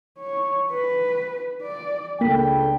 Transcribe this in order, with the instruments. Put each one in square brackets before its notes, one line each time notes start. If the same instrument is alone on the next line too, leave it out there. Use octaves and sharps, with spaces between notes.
[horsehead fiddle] C#5
B4
D5
[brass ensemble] C#2 D4 G5 [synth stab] A#3 B5 [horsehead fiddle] A4